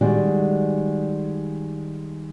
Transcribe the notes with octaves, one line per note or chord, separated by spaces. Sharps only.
D#3 G3 G#3 F#4 D5